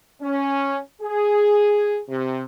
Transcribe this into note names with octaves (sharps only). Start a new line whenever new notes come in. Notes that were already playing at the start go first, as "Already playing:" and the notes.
C#4
G#4
C3